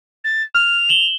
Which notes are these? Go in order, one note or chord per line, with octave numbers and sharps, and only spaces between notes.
A6
F6 F7
E7 F#7 G7